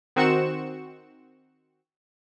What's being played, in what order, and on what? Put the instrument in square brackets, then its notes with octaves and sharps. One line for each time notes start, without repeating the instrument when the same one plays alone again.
[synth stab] D#3 C4 F#4 C#6 C#7 E7